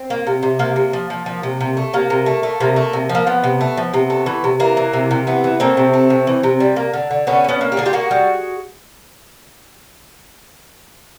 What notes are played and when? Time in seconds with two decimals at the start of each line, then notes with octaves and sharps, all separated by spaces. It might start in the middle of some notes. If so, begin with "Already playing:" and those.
Already playing: C4
0.10 A#3
0.27 C3
0.43 C3
0.59 C3 A#3
0.76 C3
0.93 F3
1.10 F3
1.26 F3
1.43 C3
1.61 C3
1.77 A3
1.93 C3 A#3
2.10 C3
2.26 A3
2.43 A3
2.60 C3 A#3
2.76 A3
2.93 C3
3.09 F3
3.15 A#3
3.27 F3 B3
3.44 C3
3.61 A3
3.77 F3
3.94 C3
4.10 A3
4.26 E3
4.44 C3
4.60 E3 A#3
4.77 E3
4.93 C3
5.11 C3
5.27 E3 B3
5.44 E3
5.60 A3 A#3 C4
5.77 C3
5.93 A3
6.10 C3
6.27 E3
6.43 C3
6.60 G3
6.76 A#3
6.93 D3
7.11 D3
7.27 D3 B3 C#4
7.44 D3
7.49 B3 C#4
7.61 A#3
7.72 G4
7.77 D3 G#4
7.86 F4 G4
7.93 A#3 F#4 G#4
8.11 G3